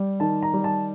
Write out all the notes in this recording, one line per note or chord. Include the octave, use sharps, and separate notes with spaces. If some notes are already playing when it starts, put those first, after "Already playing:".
Already playing: G3
D#3 A5
A#5
G3
A5